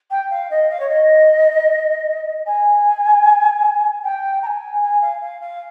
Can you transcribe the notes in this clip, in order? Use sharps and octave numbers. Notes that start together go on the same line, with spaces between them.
G5
F5
D#5
F5
C#5
D#5
G#5
G5
A#5
G#5
G#5
F5
F5
F5